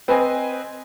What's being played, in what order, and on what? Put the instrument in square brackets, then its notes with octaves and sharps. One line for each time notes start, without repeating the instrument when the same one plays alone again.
[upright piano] C4 B4 C5 D#5 G#5